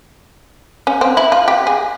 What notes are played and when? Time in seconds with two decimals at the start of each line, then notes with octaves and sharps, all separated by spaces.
0.87 C#4
1.01 C4
1.17 E4
1.32 F4
1.48 G4
1.67 G#4